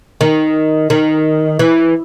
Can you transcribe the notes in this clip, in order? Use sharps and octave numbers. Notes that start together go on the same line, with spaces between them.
D#3
D#3
E3